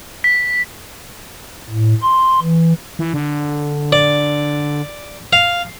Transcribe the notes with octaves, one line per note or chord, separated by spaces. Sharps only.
B6
A2
C6
E3
E3
D3
D5
F5